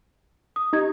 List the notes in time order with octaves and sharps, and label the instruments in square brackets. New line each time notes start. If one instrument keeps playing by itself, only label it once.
[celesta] D#6
[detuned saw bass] D#4 [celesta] G4 G#6